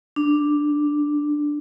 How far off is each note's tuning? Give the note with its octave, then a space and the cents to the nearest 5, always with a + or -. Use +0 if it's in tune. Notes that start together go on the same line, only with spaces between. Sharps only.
D4 +5